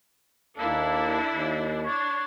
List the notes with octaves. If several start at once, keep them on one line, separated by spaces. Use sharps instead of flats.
D#2 A#3 D4 E4 A4
D#2
D4 C#5